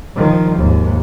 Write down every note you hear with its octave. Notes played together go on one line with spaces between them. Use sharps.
D#3 F3
D#2 G#2